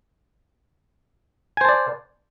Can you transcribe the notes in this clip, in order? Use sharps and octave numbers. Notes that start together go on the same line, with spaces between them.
C5 D5 G#5 A5